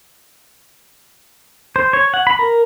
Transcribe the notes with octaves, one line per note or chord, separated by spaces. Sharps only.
C5
C#5
F#5
B5
A#4